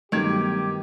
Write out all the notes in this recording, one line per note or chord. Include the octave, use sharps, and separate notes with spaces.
G2 D#3 F#3 A3 B3 G4 G#6